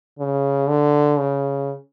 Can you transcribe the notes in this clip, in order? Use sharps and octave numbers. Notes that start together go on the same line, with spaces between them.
C#3
D3
C#3